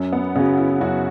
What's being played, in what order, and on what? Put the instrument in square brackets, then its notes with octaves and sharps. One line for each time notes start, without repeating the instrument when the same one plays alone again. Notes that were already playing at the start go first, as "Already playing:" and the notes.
Already playing: [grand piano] F#2
[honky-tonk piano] B3
[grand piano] C#3 [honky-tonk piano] B3
[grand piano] F#3
[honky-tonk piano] E4
[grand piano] F#2 [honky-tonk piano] F#4